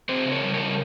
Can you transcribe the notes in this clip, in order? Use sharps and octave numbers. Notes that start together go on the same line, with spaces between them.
C4 G#4 C5
C#3
A#4 C#5
G3
A#4 C#5
C#3